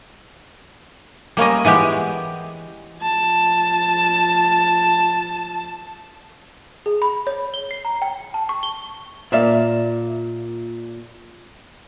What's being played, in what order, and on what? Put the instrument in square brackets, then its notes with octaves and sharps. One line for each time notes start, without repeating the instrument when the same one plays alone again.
[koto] G3 A#3 C#4 D#5
E3 G#3 B3 G4
[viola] F3 A5
[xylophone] G#4
B5
C#5
G7
C7
A#5
G5
A5
C#6
G7
[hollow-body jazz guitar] A#2 D5 E5 F5